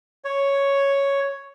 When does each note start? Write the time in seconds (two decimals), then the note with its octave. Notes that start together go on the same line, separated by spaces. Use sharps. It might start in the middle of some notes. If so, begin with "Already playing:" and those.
0.25 C#5